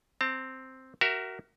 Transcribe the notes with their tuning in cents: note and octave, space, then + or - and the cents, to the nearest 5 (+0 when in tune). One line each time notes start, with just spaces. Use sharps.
C4 +0 A5 +40
F#4 +30 A#4 +0 E5 +15